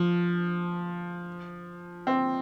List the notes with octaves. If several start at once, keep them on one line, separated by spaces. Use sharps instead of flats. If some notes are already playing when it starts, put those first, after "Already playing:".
Already playing: F3
C4